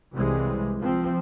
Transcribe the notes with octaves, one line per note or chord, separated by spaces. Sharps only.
C2 C3 E3 G3 G#3
F3 C4